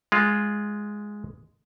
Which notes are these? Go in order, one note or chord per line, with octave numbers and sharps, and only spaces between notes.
G#3 F4